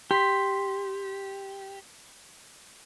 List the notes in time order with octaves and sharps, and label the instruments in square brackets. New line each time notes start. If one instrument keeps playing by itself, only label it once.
[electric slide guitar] G4 [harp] C6 B6